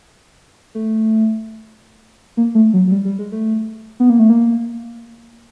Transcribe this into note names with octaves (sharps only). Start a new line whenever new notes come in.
A3
A#3
A3
F#3
F#3
G3
G3
G#3
A3
B3
A#3
A3
A#3